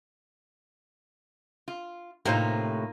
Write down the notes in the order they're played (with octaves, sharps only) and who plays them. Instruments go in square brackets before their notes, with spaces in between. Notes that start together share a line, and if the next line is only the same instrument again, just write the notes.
[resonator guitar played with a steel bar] F4
[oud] A2 C3 C5 [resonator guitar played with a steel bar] A#3 D#4 F4